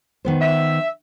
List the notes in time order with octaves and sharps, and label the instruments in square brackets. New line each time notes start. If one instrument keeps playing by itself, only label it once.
[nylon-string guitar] D#3 B3 C5
[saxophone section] E5